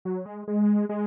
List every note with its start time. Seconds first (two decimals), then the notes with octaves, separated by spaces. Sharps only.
0.05 F#3
0.26 G#3
0.48 G#3
0.89 G#3